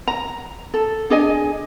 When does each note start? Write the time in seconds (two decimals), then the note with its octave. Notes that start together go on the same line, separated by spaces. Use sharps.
0.08 A#5
0.74 A4
1.10 D4 G#4 D#5 G#5